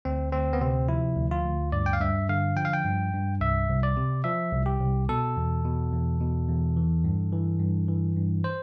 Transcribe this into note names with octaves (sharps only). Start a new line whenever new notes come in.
D2 C4
D2 C4
B3
C3 C4
F3 E4
D2
F4
D2
G2 D5
G5
F5
G2 E5
D3 F5
F3 G5
F5
G5
G2
G2
C2 E5
C2
D5
C3
F3 E5
C2
G4
C2
B2 A4
E2
B2
E2
B2
E2
E3
G2
E3
G2
E3
G2
C5